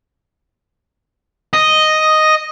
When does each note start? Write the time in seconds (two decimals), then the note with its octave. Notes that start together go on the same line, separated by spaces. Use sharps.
1.53 D#5